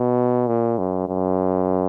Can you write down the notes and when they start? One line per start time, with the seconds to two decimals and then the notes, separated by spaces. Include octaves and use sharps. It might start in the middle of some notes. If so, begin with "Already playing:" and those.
Already playing: B2
0.47 A#2
0.78 F#2
1.08 F#2